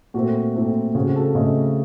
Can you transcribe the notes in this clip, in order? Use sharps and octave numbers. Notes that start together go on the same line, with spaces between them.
A#2 A3 C4 F#4
A#2 A3 C4
C#3 A3 C4 F#4
F#4
A4
C#3 A3 C4 D#5